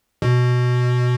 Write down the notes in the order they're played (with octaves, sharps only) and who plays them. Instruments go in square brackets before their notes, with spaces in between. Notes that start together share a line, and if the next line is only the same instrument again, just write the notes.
[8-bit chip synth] B2